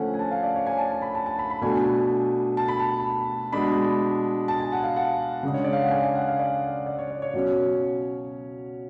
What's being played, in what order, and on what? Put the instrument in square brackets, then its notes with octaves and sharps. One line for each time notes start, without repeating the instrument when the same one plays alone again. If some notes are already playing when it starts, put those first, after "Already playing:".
Already playing: [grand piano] D3 F3 A3 C#4 F#5 G#5
G#5
A5
F5
D5
C#5
G#5
A5
A5
B5
A5
A5
B5
B5
B2 A3 D4 G#5
A5
B5
A5
B2 G#3 D4 B5
A5
G#5
F#5
F5
F#5
C#3 G#3 D4
C#5
D5
F5
F#5
G#5
G#5
F#5
F5
D5
D5
C#5
C#5
C#5
B2 F#3 C#4 C#5